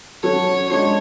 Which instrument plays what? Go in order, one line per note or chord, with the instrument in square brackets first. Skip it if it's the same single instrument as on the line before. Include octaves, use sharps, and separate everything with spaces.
[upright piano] F#3 C#4 F#4 A4 [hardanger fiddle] C#5
[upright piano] G#3 D4 F#4 [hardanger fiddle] C#5